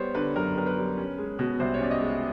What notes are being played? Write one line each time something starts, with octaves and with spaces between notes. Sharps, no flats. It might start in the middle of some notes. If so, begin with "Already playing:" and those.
Already playing: G3 B3 C5 C#5
D3 B4
F#2 A#4
B3 A#4
B4
G3
C#4
G#3
B2
C2 C5
C#5
C#4 D5
D#5
G#3